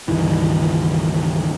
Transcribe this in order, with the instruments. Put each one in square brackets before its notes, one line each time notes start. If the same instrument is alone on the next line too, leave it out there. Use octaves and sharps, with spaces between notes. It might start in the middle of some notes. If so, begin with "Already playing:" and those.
[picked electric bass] C#2 G2 D#3 E3